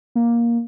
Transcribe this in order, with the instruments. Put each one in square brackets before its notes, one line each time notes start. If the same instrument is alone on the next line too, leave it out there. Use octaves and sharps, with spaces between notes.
[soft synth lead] A#3